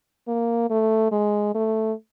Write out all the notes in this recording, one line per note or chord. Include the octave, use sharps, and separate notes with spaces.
A#3
A3
G#3
A3